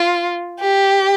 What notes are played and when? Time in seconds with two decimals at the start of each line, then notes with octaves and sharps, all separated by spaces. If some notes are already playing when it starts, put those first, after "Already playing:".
Already playing: F4
0.60 G4